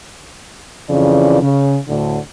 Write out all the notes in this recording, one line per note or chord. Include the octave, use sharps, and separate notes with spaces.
F2 C#3 E3 D5
C#3
D2 A2 D3